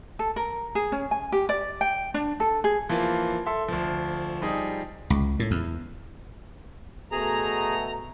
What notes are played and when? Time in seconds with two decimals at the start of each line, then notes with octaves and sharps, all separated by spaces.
0.19 A4
0.36 A#4
0.75 G#4
0.92 C#4
1.11 G#5
1.32 G4
1.49 D5
1.81 G5
2.14 D4
2.40 A4
2.64 G#4
2.89 E3 F3 A#3 F4
3.46 A4 E5 C6
3.68 D2 F3
4.41 F3 G3 D#4 G#4
5.10 C#2
5.40 A2
5.51 E2
7.12 B2 A3 G#4 A#5